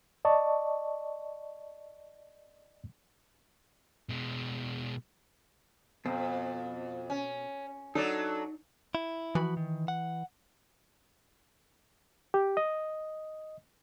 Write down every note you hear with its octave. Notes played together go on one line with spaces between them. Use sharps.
D5 D#5 A5 C#6
B2 G#3
F2 B2 C4
C#4
F#3 D4 D#4 A4 D5
E4
E3 F3 F#4 B5
D#3
F#5
G4
D#5